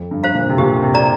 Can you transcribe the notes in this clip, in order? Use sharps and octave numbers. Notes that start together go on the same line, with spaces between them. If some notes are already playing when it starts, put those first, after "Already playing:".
Already playing: F2
G2
C5 F5 A#5
A#2
C3
A#2 G4
C3
D5 A#5